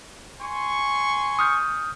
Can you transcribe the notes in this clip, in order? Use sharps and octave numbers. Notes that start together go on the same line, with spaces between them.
G#5 C6 C#6
D#6 F6 G6